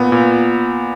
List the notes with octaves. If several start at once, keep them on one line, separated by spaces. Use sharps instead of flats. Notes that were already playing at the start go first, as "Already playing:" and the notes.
Already playing: A#2 B3
A#2